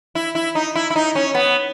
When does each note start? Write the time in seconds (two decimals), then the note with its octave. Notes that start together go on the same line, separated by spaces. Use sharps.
0.15 E4
0.35 E4
0.55 D#4
0.75 E4
0.90 E4
0.96 D#4
1.15 C#4
1.35 B3